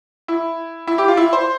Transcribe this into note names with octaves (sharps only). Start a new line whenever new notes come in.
E4
E4
G4
F4
E4
C5